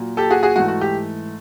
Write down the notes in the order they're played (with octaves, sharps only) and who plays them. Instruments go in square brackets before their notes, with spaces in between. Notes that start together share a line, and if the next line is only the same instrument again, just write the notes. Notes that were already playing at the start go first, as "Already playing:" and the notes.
Already playing: [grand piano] A#2 F#3 A#3
G4 A4
F#4 G#4
F#4 G#4
G#2 E3 A3 F#4
F#4
G4